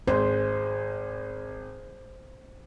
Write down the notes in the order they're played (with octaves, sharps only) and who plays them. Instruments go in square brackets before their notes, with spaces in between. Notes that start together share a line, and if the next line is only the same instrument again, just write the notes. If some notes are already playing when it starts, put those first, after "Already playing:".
[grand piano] G#1 G#3 [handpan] C5